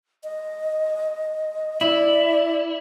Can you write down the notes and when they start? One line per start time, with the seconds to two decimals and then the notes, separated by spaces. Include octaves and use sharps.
0.24 D#5
1.81 E4 D5